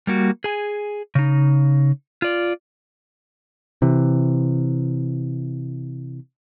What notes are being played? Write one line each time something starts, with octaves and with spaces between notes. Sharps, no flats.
G3 A#3 F#4
G#4 G#5
C#3 D#4
F4 D5
C3 E3